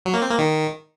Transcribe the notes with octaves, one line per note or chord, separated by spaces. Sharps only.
F#3
A#3
C4
A#3
D#3